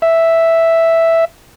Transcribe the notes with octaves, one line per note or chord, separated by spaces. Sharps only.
E5